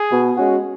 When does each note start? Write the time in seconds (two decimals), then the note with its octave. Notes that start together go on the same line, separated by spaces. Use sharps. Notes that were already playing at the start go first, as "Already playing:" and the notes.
Already playing: G#4
0.11 B2
0.37 G#3 C#4 F#4